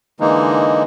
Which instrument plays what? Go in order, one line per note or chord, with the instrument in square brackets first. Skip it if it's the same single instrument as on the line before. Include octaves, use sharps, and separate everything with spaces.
[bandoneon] D3 E3 G#3 A#3 D#4